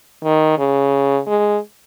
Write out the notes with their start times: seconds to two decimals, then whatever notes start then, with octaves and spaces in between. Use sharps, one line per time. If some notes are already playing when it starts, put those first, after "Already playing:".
0.24 D#3
0.58 C#3
1.27 G#3